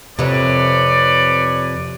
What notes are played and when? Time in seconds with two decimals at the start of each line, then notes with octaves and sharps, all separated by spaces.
0.19 F2 C3 B4 C#5 D5